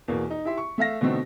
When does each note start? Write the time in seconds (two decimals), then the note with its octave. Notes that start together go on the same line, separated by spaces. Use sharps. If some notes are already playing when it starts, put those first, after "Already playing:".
0.08 E2 B2 A#3
0.30 D#4
0.45 E4 G4 E5 C6
0.58 C#6
0.78 A3 E5 F5 A#6
1.01 B2 D3 A3 C4 D#4